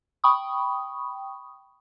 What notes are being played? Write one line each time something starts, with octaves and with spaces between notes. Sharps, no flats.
G5 B5 C#6 D#6